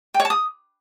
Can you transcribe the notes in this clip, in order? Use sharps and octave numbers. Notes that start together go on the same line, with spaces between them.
G5
C#5
A5
D#6